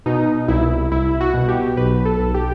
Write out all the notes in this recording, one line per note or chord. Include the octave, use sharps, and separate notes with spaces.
B2 D#4
C2 E4
C2 E4
F#4
B2
G4
B1 B4
A4
B1
G4